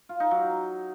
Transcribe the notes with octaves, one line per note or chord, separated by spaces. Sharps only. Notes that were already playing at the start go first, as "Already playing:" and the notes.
F4
D#4
F#3